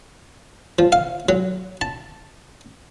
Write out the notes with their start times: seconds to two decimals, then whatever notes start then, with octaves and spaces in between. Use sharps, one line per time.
0.79 F3
0.92 F5
1.29 F#3
1.81 A5